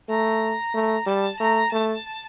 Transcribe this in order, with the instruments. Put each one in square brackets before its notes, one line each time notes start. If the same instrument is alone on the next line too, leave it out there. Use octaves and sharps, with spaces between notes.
[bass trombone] A3 [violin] A#5
[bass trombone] A3
[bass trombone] G3 [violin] A5
[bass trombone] A3 [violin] A#5
[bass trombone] A3 [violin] A5